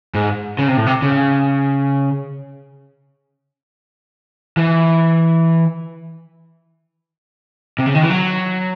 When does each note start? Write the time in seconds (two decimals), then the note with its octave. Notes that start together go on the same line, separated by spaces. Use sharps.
0.15 G#2
0.59 C#3
0.68 C3
0.77 A2
0.87 C3
1.02 C#3
4.57 E3
7.79 C3
7.86 C#3
7.95 D#3
8.03 E3
8.10 F#3